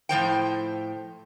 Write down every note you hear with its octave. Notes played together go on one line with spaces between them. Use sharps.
A2 F3 C5 G5